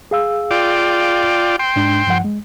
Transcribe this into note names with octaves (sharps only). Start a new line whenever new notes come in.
G#4 F5 E6
F4 D5 G5
G5 C6
G#2 G#3 D4
G2 F3 F#5
G#3